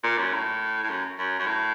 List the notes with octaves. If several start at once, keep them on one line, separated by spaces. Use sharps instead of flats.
A#2
F#2
A2
A2
F#2
F#2
F#2
A2